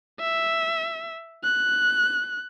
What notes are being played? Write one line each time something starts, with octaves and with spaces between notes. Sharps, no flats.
E5
F#6